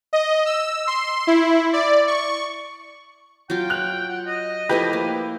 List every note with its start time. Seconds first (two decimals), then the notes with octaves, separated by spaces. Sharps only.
0.13 D#5
0.46 E6
0.87 C6
1.27 E4
1.73 D5
2.07 C#6
3.50 F#3 F4 G5
3.70 F#6 F7
4.09 F#5
4.26 D#5
4.69 F3 A3 E4 G4 B4
4.93 A#3